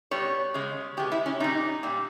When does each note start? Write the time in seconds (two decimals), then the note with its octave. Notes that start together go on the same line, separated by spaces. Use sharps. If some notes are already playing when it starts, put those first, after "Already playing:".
0.11 B2 G3 C#5
0.54 C#3 G#3
0.97 B2 G#3 G4
1.12 E4
1.26 C#4
1.40 A#2 G3 D#4
1.83 A#2 G3